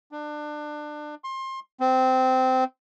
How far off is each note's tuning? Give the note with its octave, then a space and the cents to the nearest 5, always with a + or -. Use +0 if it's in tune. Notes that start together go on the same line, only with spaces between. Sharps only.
D4 +25
C6 +25
C4 -15